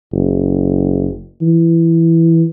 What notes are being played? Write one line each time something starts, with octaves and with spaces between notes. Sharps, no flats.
F#1
E3